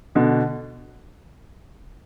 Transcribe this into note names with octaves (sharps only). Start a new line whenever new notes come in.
B2 D3